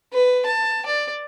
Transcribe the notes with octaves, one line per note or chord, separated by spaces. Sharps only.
B4
A5
D5